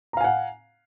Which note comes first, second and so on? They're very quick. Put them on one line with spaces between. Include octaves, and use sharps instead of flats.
A#5 F5 G#5 F#5